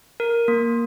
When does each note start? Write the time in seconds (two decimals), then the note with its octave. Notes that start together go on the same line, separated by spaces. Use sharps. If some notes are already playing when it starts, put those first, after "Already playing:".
0.20 A#4
0.48 A#3